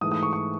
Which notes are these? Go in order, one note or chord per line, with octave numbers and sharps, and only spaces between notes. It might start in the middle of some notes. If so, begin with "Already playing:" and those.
G#2 E3 A3 D#6
D#6
C#6
C#6